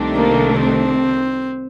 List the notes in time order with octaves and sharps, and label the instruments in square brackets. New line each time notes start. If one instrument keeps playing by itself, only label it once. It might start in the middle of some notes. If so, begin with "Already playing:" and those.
Already playing: [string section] C2 C3 D#3 A3 D4
[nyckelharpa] A#3
C4